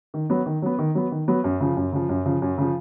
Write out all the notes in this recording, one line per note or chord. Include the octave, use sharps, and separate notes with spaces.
D#3
F#3 B3
D#3
F#3 B3
D#3
F#3 B3
D#3
F#3 B3
F#2
C#3 F3
F#2
C#3 F3
F#2
C#3 F3
F#2
C#3 F3